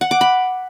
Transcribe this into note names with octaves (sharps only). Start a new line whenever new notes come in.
F#5
D6
B5